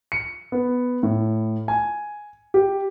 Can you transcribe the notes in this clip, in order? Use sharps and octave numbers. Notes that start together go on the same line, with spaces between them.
C#7
B3
A2
G#5
G4